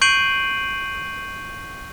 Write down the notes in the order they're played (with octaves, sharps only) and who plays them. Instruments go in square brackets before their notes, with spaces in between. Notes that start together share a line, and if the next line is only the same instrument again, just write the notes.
[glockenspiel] C#6 G6 C7 D7 D#7 F#7